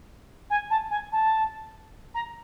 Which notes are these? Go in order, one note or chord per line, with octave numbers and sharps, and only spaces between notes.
G#5
A5
G#5
A5
A#5